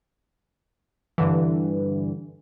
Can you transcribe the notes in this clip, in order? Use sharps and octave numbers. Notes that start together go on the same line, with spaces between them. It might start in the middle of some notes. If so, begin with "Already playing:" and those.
G2 D3 E3